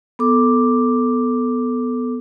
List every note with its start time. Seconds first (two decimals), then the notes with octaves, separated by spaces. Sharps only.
0.19 B3 A4 D6